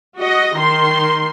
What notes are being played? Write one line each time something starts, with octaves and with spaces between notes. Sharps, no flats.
F#4 D#5
D#3 C6